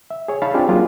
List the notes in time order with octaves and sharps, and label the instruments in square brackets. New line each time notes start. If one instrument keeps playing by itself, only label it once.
[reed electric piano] E5
G#4 C#5
D#4 C#5 F5 A5 B5
C4 D4 D#4 F4 G4 G#4
F#3 A#3 D4 F4 G#4